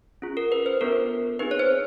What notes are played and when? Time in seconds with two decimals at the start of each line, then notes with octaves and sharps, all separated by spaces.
0.22 C#4 F4 G#4
0.37 A#4
0.52 B4
0.66 C5
0.81 B3 D4 F4 A4 A#4
1.39 C4 D#4 G#4 B4
1.51 C#5
1.59 C5